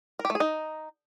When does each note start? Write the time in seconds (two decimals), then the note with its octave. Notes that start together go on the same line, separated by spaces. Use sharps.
0.19 A#4
0.25 G4
0.30 A3
0.35 G#4
0.40 D#4